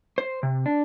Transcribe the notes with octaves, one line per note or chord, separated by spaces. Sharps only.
C5
C3
D4